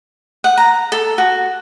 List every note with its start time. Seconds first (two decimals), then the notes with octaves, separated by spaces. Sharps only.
0.44 F#5
0.57 A#5
0.92 A4
1.18 F#4